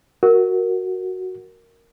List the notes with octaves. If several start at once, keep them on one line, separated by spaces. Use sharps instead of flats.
F#4 A#4